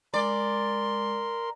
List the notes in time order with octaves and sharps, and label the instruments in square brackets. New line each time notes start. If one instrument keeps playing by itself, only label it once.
[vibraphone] G#3 [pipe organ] A#4 [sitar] D5 [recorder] C6